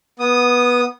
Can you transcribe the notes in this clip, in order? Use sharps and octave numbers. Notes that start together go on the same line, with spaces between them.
B3 D#6